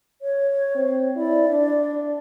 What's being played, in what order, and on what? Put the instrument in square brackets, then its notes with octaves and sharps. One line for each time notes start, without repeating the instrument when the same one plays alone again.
[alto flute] C#5
[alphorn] C4
[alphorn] E4 [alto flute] D5
[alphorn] D4